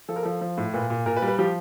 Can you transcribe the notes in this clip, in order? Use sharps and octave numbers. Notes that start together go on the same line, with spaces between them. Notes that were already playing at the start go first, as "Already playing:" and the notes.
F3 A4
A#4
F3 A4
F3
A2
A#2 B4
A#2
A#2 A#4
B4
G3
B4
F3 G4